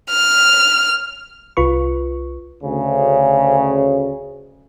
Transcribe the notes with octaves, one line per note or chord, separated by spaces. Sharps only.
F6
C2 F4 B4 C#6
D2 C#3